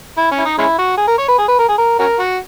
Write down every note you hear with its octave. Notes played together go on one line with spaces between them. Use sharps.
E4
C#4
E4
D#4
G#3 C#4 E4
F#4
G#4
A#4
C#5
B4
G#4
B4
A#4
G#4
A#4
C#4 F#4 A#4
F#4